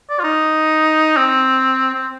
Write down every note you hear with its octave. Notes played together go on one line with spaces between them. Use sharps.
D5
F4
D#4
C4
C4